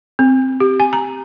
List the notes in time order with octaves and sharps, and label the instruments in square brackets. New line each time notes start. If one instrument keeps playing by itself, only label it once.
[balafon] C4
G4
G#5
A#5